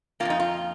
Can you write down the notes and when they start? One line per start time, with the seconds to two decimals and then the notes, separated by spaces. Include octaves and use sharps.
0.20 D#3 A#3 F4
0.25 F2 D#4
0.40 F4